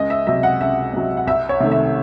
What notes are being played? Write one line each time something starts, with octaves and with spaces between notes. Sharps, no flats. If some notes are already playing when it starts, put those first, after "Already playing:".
Already playing: C#2 D#5
E5
C3 F#3 E5
F#5
C#2 E5
C3 F#3
F#5
C2 E5
C#5
C3 D#3 A3
E5